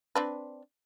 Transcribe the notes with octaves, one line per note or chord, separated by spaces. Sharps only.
C4 D4 B4